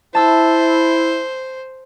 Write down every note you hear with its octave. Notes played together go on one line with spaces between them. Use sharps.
E4 C5 A5 E6